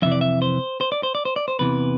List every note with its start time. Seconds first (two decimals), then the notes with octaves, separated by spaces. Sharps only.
0.02 F2 C3 E3 E5
0.12 D5
0.21 E5
0.42 C5
0.81 C5
0.92 D5
1.03 C5
1.15 D5
1.25 C5
1.36 D5
1.48 C5
1.59 E2 C3 E3 B4